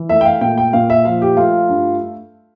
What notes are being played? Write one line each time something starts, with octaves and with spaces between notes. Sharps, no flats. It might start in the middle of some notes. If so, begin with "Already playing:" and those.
Already playing: E3
A3 E5
G5
F5
A#2 G5
G5
A#2 F5
E5
F3 F5
G4
A3 F4
G2